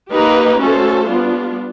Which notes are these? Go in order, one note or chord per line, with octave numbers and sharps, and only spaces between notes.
A#3 D#4 G4 B4
A3 C#4 F#4 A4 C5
G3 B3 D4 F4